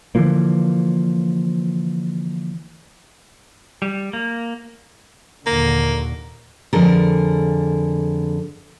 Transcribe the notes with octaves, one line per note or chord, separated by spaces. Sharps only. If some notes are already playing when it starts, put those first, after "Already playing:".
D3 E3 F3 A#3
G3
A#3
D#2 A#2 D3 A#3
F2 D3 G#4 A#4